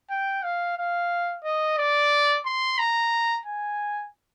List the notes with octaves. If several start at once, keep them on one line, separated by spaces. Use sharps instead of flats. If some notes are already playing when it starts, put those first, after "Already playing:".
G5
F5
F5
D#5
D5
C6
A#5
G#5